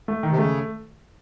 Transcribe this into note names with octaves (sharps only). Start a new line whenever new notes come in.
A3
D#3
C3
C#3 A3